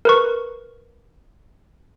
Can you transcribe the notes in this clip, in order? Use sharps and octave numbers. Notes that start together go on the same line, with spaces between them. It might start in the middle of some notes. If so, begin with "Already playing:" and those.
A#4 B4 C#6